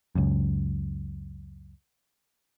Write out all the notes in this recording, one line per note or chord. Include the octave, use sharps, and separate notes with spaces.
C#2 F#2